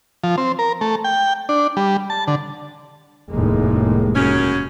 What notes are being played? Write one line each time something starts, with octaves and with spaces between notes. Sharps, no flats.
F3
C4
A#4
A3
G5
D4
G3
A5
D3
F1 D#2 A2 G#3 A#3
F#2 C#3 C#4